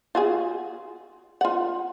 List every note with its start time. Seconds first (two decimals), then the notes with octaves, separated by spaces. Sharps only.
0.15 F4 F#4 G#4
1.41 F4 F#5